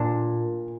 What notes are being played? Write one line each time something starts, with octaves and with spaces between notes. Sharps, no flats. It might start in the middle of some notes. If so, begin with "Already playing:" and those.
Already playing: A#2 D4